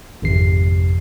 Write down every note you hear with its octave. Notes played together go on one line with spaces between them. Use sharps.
G#1 F2 C3 C7